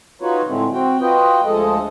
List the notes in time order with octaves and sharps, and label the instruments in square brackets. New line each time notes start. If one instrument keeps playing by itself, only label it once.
[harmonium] D#4 F4 F#4 B4 C#5
A2 D3 G#3 A3 C4
C4 F#4 G5
F4 F#4 B4 D#5 G5
D2 F3 G#3 A4 D#5